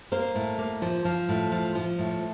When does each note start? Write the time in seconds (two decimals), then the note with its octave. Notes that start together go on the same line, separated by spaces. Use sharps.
0.12 A#3 C5
0.35 A2
0.58 A#3
0.82 F3
1.05 F3
1.29 A2
1.52 F3
1.75 F3
1.98 A2